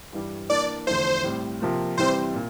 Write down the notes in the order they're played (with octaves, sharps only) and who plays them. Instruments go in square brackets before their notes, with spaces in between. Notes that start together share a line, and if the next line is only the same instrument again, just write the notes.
[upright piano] G2 E3 G3
[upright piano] E3 A#3 D4 [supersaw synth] D5
[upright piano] E2 D3 F3 A3 E4 [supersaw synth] C5
[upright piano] A2 G3 C4
C3 F3 A#3 F4
[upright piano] C3 E3 G3 C4 [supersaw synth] C5
[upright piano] A#2